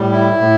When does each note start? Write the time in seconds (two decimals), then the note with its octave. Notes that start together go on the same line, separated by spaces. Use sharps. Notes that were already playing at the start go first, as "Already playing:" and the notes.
Already playing: A2 G3
0.12 E4
0.41 A2